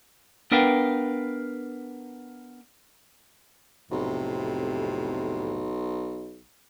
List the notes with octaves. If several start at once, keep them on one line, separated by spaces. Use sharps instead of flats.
B3 D4 A#4 B4 F5 G5
B1 F2 A2 C3